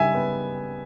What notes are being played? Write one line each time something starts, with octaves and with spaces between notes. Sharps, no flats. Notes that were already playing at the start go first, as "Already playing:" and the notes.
Already playing: C#3 G3 D#4 E5 G#5
B3